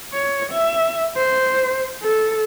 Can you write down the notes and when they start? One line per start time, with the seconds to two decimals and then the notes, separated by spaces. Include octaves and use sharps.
0.13 C#5
0.52 E5
1.17 C5
2.03 A4